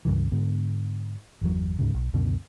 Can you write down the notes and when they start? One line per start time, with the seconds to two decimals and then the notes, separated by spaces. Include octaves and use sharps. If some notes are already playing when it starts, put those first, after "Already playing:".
0.05 C#2 G2 C#3 E3
0.32 G#2 D3 B3
1.41 G1 E2 F#3
1.79 D2 G#2 C#3
1.94 B1
2.13 C#2 F#2 B2 D3